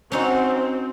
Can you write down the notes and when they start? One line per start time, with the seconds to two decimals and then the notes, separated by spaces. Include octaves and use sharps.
0.12 C4 C#4 D#4 F#4